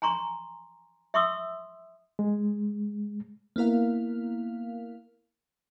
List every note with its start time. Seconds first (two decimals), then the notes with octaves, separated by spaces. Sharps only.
0.02 G#5 A#5 C6 C#6
1.14 E5 C6 C#6 D#6 E6
2.19 G#3
3.56 A#3 B3 E4 A#4 F5